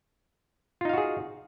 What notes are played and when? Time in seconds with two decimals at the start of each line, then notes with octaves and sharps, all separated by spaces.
0.81 F4
0.85 D#4
0.89 F5
0.93 F#4
0.98 G#4